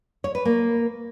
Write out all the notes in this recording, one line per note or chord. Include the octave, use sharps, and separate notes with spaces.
C#5
B4
A#3